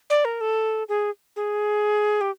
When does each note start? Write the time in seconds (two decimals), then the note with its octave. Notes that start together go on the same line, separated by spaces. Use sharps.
0.10 D5
0.25 A#4
0.41 A4
0.89 G#4
1.36 G#4
2.21 G4